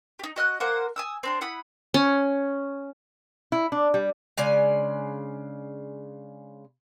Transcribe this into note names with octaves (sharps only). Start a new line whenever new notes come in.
D#4 G4
F#4 D#5 F6 F#6
A#3 A#4 C5 F#5
G#5 D#6 E6
C4 D4 C6
E4 F#5 B5 D#6
C#4
E4
D4
G3
C#3 G#3 D4 G#5